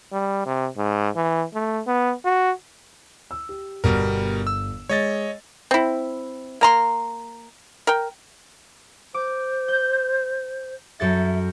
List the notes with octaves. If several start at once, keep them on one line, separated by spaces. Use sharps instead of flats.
G3
C3
G#2
E3
A3
B3
F#4
E6
G4
G1 B2 G3 A#4
E6
G#3 C#5 D#5 A6
C4 E4
A#3 A#5 C6
A#4 G5
C5 D6
G6
F#2 A4 E5 A6